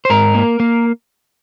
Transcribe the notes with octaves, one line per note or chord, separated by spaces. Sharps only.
C5
G#2 A#4
A#3
A#3